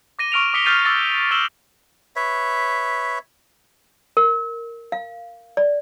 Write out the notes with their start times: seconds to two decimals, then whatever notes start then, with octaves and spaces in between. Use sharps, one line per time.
0.19 D6 A#6 D#7 G7
0.32 C#6 D6 F6 D7 D#7 F7
0.54 D6 D#6 B6 C#7 G7
0.65 D#6 F6 G6 A6 C7 D#7
0.85 D6 E6 F6 A6 A#6
1.31 E6 F6 A6 E7 F#7 G7
2.16 B4 C#5 E5
4.17 A#4
4.92 F5
5.57 D5